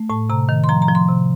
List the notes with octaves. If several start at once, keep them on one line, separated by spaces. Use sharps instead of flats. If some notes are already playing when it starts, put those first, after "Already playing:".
Already playing: A3
A2 A5
C3 A#5
D#3
C6
F3 A#5
A#5
F3
C6
C3